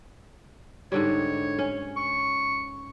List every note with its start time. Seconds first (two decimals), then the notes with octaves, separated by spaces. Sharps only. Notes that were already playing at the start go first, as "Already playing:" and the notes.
0.92 G#2 D3 G3 C#5
1.59 C#4
1.96 C#6